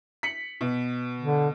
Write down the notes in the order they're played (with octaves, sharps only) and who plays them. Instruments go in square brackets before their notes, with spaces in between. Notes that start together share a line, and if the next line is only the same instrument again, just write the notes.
[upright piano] B6 C#7 F#7
B2
[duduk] D3